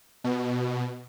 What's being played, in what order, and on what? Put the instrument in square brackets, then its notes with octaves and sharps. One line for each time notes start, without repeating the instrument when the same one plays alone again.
[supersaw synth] B2